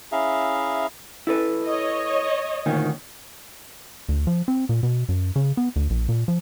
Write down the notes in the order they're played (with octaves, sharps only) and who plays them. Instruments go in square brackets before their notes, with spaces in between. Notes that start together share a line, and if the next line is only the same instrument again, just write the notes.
[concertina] C#4 E4 G#4 E5 F5 A#5
[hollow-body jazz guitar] E4 A4 B4
[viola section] C#5 D#5
[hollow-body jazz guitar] D2 A#2 D#3
[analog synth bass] D2
F3
C4
A#2
B2
F#2
C#3
B3
D2
A#1
A#2
F3